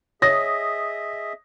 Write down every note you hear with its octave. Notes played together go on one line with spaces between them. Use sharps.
G#4 C#5 D#5 E5 D#6 A#6